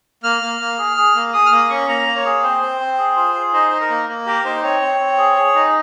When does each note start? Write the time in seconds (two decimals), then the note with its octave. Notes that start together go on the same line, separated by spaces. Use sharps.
0.23 A#3 F6
0.41 A#3
0.60 A#3
0.78 G#4
0.96 G#4
1.15 A#3
1.33 G#4 D#6
1.46 F6
1.51 A#3 D#6
1.70 C#4 C#6
1.88 A#3 A#5
2.07 A#3
2.15 C#5
2.25 G#4
2.43 C4 C5
2.61 C4
2.80 C4
2.98 G#4
3.16 F4
3.34 G#4
3.53 D#4 C5
3.71 D#4
3.80 A#4
3.90 A#3
4.08 A#3
4.26 G4 A#4
4.44 D#4 C5
4.63 C4 C#5
4.81 C4
5.00 C4
5.18 G#4
5.36 G#4
5.55 D#4